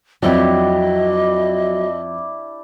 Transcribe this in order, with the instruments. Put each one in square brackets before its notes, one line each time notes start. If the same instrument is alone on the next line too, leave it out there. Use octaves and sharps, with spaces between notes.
[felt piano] F2 [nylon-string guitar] F#3 [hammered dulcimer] D4 E4 G4 [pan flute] D#5